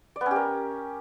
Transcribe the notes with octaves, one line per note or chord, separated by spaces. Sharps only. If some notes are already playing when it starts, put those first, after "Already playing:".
D5
B3
C#4
G4
A#4